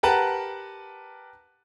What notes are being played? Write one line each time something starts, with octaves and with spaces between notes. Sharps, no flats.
G4 A#4 B4 F#5 A5